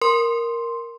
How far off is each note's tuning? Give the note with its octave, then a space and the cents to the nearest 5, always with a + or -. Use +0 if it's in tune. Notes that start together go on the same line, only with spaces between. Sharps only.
A#4 +0 C6 +0